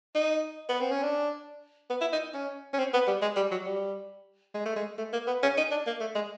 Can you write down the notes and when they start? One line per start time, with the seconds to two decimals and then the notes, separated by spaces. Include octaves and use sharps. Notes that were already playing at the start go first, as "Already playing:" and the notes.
0.15 D#4
0.69 B3
0.81 C4
0.91 C#4
1.03 D4
1.90 B3
2.01 E4
2.12 D#4
2.34 C#4
2.73 C#4
2.79 C4
2.93 B3
3.07 G3
3.22 G#3
3.36 G3
3.51 F#3
3.66 G3
4.55 G#3
4.65 A3
4.76 G#3
4.98 A3
5.13 A#3
5.27 B3
5.43 C#4
5.57 D#4
5.71 D4
5.87 A#3
6.00 A3
6.15 G#3